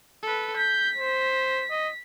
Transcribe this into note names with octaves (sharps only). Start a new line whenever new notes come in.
A4 B4
G6 B6
C5
D#5